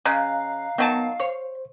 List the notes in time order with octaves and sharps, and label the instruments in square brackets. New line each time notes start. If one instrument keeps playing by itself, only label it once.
[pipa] C#3 [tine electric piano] D#5 A#5 F#6 [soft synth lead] F5
[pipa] D#3 F#3 A5 [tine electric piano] B3
[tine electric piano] C5 [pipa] C#5